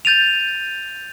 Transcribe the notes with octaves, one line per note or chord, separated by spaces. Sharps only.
G6 A6 D#7 F7